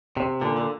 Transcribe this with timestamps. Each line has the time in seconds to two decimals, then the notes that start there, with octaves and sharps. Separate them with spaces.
0.17 C3
0.41 A#2 D3
0.56 D3